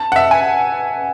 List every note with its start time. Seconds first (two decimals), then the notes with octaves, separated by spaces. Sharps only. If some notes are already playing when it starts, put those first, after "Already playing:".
Already playing: A5
0.12 F#5
0.16 E5
0.31 G#5